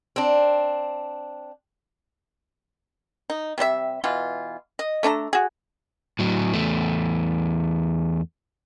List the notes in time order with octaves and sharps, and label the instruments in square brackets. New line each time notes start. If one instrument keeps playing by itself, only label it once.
[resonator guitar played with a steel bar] C4 D4
[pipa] D#4
C3 G3 D4 E5
B2 E3 F4
D#5
A3 D4 A4 A#5
F#4 G#4
[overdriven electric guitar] A2 F#3
E2 A3